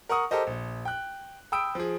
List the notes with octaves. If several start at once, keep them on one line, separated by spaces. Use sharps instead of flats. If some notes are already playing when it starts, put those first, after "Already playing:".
A#4 F#5 C#6 D#6
G4 A4 A#4 C5 D#5
A#1
G5 F#6
G5 B5 D#6 E6 D7
F3 G#4